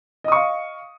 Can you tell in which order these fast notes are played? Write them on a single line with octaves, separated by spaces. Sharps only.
D#5 D#6 C#6 F5